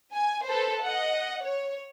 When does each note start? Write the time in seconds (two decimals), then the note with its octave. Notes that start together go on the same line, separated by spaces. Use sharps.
0.12 G#5
0.46 A4 B4 C5
0.83 D#5 F#5
1.41 C#5